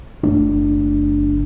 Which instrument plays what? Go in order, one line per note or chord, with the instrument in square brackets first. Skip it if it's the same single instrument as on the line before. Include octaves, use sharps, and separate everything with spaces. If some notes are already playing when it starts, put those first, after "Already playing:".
[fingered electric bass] F#1 A3 D4